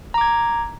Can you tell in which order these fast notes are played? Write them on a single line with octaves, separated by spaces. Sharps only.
A#5 D6 G#6